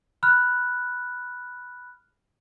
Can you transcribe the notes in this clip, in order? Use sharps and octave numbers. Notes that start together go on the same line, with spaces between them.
B5 F6 F#6